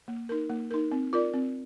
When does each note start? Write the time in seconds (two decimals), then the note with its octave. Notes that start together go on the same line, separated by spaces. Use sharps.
0.08 A#3
0.29 D#4 A#4
0.50 A#3
0.71 D#4 A#4
0.92 C4
1.13 F4 A#4 D5
1.34 C4